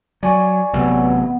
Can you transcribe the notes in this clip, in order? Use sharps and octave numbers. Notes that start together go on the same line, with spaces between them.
F#3 D5 G#5 C#6
A1 C3 F#3 B3